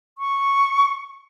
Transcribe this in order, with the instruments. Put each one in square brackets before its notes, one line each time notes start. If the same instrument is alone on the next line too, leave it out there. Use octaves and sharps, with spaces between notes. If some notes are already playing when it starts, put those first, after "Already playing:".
[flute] C#6